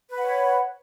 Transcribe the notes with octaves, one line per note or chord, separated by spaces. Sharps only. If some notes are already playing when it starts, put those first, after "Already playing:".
B4 C#5 F#5 B5